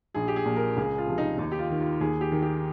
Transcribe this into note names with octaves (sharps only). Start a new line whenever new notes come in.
A#1 G#4
G4
G#4
A#2 F3
A#4
C#2 G#4
F4
C3 F3
D#4
D#2 D#4
G4
F4
D#3
F4
D#2 G#4
G4
D#3
G4